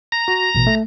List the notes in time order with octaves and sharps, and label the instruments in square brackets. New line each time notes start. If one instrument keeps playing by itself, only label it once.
[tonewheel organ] A#5
[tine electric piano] F#4
A1 B2
A3